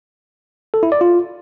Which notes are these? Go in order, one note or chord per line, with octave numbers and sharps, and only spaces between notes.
A4
E4
D5
F4